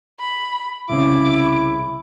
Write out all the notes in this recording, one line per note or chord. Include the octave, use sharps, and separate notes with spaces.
B5
C2 C#3 C#4 E4 D6